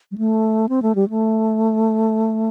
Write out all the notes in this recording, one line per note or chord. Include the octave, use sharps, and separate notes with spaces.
G3
A3
C4
A3
G3
A3